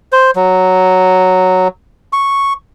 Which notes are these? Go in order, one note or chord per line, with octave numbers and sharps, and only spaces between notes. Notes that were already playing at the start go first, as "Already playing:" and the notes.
C5
F#3
C#6